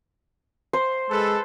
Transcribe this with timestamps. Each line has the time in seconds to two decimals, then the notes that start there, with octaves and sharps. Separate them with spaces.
0.73 C5
1.10 G#3 A4 B4